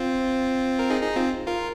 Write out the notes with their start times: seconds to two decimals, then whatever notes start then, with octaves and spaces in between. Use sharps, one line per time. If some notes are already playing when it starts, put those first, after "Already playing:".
Already playing: C4 F4
0.79 A#4
0.90 D#4 G#4
1.03 D#4 G#4
1.16 C4 F4
1.47 F4 A#4